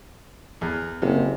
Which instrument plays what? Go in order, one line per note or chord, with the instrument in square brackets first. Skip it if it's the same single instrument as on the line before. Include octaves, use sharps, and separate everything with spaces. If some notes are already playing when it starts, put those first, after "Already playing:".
[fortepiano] E2
[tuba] F#1 [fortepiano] C3